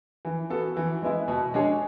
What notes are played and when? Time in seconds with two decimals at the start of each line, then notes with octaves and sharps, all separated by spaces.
0.25 E3
0.50 B3 F#4 A4
0.77 E3
1.02 G#3 B3 E4
1.28 B2
1.54 G#3 D4 G#4 C#5